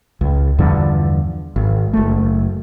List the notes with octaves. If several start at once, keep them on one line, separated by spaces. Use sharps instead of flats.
C#2
E2 G2 D3 F3
G#1
F#1 A3